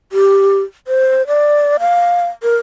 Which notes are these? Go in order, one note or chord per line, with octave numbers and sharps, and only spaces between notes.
G4
C5
D5
F5
A#4